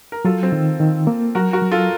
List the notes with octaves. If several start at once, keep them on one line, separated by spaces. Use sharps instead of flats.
A#4
F#3 F4 A4
C4
D#3
D#3
A#3
F#3 F#4 A#4
F#4 A#4
F#3
F4 A4